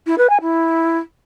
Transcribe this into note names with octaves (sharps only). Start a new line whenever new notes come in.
E4
B4
G#5
E4